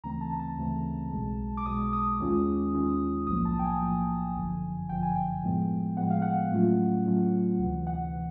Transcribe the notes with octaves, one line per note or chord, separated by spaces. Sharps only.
D2 C#3 E3 A3 C4 A#5
A5
A#5
A5
D2 C#3 E3 A3 C4
B1 B2 G#3
D6
B1 B2 G#3 D#6
D#6
D#2 D#3 G#3 C#4 F4
D#2 D#3 G#3 C#4 F4
B1 A2 F3 A#3 D#6
A5
G5
G#5
B1 A2 F3 A#3
G1 F#2 D3 F3
G1 F#2 D3 F3 G5
G#5
G5
A2 F3 G#3 B3
A2 F3 G#3 B3 F#5
F5
F#5
A2 F#3 A3 C#4 F4
A2 F#3 A3 C#4 F4
D2 C3 E3
F#5
C3 E3